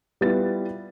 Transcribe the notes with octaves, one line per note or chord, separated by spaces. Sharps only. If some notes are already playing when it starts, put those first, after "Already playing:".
G3 B3 E4 F4 B4 A6